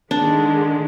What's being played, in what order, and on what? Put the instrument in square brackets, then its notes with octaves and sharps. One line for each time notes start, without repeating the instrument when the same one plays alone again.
[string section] D3 D#3 G#3 [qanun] D4